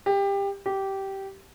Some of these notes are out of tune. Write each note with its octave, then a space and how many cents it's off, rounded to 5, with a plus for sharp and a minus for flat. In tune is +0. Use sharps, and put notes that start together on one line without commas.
G4 +20
G4 -15